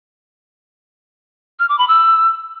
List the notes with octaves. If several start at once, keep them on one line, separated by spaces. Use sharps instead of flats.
F6
D6
B5
E6